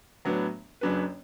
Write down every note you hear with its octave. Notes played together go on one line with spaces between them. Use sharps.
A2 F#3 B3 D4 B4
F#1 F#2 F#3 D4 B4